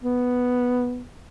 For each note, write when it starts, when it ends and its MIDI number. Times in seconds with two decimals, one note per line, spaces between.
0.04 1.03 59